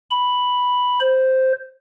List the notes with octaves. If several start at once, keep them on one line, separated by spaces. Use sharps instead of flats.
B5
C5